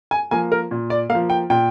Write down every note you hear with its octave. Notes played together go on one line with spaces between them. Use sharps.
G#5
F3 A#3 G#5
A#4
A#2
D5
A#3 F5
F3
G5
A#2 G5